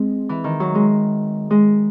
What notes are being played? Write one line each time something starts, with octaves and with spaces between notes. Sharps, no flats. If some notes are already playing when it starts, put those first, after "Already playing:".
Already playing: G#3 C4
E3
D#3
F#3
G#3
G#3